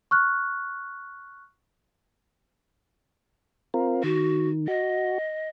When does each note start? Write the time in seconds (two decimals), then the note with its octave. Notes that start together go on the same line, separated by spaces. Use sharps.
0.11 C#6 F6 F#6
3.74 C4 F4 A#4
4.03 D#3 F#4
4.68 F#4 D#5